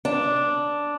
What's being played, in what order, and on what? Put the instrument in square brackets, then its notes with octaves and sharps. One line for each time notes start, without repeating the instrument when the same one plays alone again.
[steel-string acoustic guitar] D4